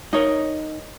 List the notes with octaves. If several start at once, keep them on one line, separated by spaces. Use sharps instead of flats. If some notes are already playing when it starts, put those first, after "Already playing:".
D#4 A#4 C#5 D#5